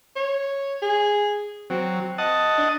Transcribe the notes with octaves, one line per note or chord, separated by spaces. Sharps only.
C#5
G#4
F#3 C4
D#5 F#5 A5
D4